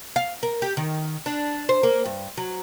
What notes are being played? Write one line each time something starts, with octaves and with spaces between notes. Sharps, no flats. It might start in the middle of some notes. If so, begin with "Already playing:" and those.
F5
A#4
G4
D#3
D4
C5
A#3
G2
F#3